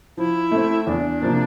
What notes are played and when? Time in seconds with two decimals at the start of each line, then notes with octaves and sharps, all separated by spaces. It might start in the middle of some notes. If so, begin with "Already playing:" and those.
0.17 F3 E4
0.51 A3 C4
0.87 E2 D4
1.22 C3 F3 A#3